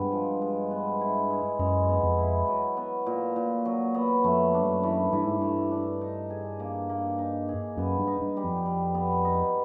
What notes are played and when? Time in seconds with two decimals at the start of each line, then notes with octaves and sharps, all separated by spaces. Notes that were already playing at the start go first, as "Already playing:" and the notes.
Already playing: G2 C3 G#3 B3
0.12 F3
0.42 G#3
0.71 B3
1.01 E4
1.30 G#3
1.59 F#2 G#3
1.89 B3
2.03 F2
2.18 E4
2.48 F#3
2.77 B3
3.06 A#2
3.36 A#2
3.65 F#3
3.95 B3
4.24 F2 A3
4.54 D4
4.62 G2
4.68 F#2
4.83 E3
5.13 G2 E3
5.26 G#2
5.39 G2 A3
5.71 D4
6.01 D#4
6.30 G#4
6.60 A#3
6.89 A#3
7.18 D#4
7.48 G#4
7.77 F#2 B3
7.99 G2
8.07 D#4
8.21 G2
8.37 G3
8.44 F2
8.65 G3
8.95 B3
9.25 D#4